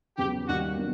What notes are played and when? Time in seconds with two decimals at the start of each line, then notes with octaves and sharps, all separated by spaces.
0.18 F1 E2 C#3 F#3 G4
0.48 D#2 D#3 G3 F#4
0.78 B2 F#3 A#3 D4